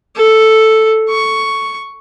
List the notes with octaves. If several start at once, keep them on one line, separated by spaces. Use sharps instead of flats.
A4
C#6